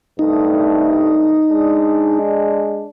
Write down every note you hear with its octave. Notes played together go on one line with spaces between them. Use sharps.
C2 G2 A3 D#4
G#3 D4